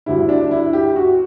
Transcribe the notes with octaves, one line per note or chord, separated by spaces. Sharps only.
D2 D3 G3 E4
D4
E4
G4
F#4